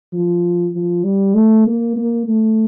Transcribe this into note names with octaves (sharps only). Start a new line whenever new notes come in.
F3
F3
G3
A3
A#3
A#3
A3